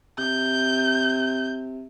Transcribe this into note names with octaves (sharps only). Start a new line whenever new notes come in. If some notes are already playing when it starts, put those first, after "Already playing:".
C3 G6